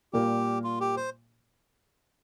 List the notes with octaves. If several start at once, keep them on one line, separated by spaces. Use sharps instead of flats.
A#2 G3 A#3 G4
F4
G4
C5